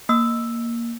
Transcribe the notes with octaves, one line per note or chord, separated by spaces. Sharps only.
A#3 E6